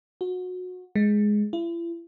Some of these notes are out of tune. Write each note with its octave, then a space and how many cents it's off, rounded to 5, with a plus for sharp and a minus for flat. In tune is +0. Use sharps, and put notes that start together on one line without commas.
F#4 -25
G#3 +5
E4 +40